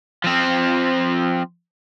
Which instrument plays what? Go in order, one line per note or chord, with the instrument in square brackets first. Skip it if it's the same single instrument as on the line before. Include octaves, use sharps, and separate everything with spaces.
[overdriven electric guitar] F3 C4